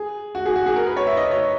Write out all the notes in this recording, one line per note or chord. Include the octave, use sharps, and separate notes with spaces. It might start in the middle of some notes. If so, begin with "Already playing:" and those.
Already playing: G#4
F#4
G#4
F#4
G#4
A#4
B4
C#5
E5
D#5
C#5